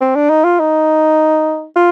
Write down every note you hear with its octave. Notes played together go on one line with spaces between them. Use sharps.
C4
D4
D#4
F4
D#4
F4